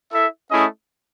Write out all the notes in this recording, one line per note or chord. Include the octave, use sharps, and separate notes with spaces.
E4 A4 E5
A3 C#4 E4 G#4 D#5